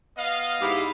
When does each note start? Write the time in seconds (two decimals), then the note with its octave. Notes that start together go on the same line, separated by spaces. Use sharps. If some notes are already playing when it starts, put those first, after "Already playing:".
0.18 B3 D#5 F5
0.61 G#2 E4 G4